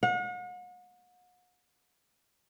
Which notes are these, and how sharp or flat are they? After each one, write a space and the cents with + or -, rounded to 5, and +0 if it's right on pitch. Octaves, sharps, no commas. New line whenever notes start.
F#5 -40